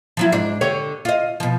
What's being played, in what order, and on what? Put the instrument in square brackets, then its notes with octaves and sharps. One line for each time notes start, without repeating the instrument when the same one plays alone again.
[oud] F3 F#3 E4
G#2 D4
D3 G4 C#5
F4 D#5
B2 F3